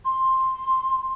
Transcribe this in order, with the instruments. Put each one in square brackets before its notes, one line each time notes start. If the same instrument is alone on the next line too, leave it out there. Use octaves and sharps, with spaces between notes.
[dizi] C6